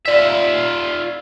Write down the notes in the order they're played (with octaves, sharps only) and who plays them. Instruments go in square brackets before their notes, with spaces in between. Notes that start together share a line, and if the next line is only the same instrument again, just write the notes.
[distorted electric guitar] F4 E5 [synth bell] D5 B6